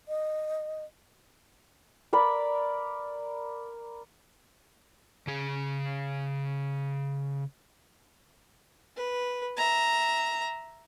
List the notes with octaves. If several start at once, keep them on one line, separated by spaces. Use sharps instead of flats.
D#5
A#4 D5 B5
C#3 G#4
B4
E5 A#5